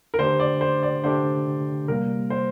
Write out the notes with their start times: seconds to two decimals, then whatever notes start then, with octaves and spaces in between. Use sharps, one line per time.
0.14 A#4
0.18 D3 A3 D4 G4 C5
0.40 D5
0.61 C5
0.83 D5
1.04 D3 A3 D4 G4 C5
1.88 C3 G3 A#3 A#4
2.30 C5